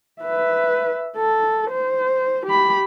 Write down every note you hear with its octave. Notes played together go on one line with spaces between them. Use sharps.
B4 E5
A4
C5
G4 B5